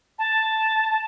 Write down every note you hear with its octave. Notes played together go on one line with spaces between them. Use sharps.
A5